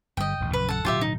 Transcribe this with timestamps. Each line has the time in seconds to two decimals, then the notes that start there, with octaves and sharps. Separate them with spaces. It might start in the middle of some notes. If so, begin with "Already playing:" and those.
0.17 G1 G3 D#5 G5
0.40 D#1 A1 D2
0.53 A#1 F#2 C#3 B4
0.69 A4 F#5
0.85 D1 B2 F#3 F4 G4 E5
1.01 D#4